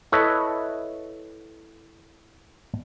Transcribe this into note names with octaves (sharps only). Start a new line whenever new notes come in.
E4 A4 B4 C#5 D#5 E5